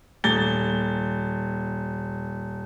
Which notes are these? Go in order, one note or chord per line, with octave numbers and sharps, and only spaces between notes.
D#1 A6 G7